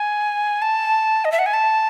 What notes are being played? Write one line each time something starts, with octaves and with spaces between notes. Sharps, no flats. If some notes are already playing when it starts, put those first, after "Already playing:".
Already playing: G#5
A5
D#5
E5
F#5
G#5
A5